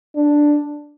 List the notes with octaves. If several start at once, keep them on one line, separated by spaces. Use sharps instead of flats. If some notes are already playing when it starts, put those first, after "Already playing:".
D4